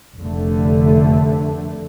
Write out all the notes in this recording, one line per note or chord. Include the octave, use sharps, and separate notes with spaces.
F1 D3 A3